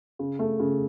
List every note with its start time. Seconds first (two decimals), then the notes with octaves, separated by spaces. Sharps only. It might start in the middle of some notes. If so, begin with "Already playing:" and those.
0.19 C#3
0.39 A3
0.59 C#3